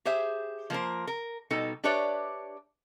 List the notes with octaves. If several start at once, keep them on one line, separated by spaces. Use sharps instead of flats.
G4 G#4 C5 E5
F3 A#3 A#4 C5
A#4
B2 G3 D#4 A4
D4 G4 B4 C#5 D5 E5